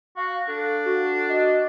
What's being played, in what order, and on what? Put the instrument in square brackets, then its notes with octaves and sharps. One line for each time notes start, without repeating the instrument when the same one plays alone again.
[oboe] F#4 [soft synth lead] F5
[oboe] D4 [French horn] A4
[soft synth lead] F#4
[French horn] D#5